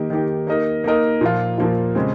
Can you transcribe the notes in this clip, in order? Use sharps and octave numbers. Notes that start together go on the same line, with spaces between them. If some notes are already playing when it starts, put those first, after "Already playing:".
Already playing: D#3 A#3 D#4 G4
D#3 A#3 D#4 G4
A#3 D#4 A#4 D#5
A#3 D#4 A#4 D#5
A#2 F3 A#3 F4
A#2 F3 A#3 F4
C#3 G#3 C4